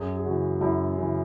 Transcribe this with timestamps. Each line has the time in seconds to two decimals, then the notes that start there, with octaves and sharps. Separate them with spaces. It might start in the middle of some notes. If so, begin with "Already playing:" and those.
Already playing: F#2 G#4
0.17 G#4
0.25 C#3 E3 F#4
0.61 F#2 E4
0.97 C#3 E3